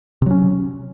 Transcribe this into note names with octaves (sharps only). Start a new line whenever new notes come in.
C3 F#3 C#4